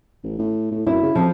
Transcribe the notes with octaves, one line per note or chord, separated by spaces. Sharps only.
A1
A2
A2
F#2 E4
C#3
F2 F3